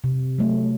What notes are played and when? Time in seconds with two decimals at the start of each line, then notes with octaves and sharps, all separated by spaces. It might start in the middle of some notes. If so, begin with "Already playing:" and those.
0.04 C3
0.38 F#3 A3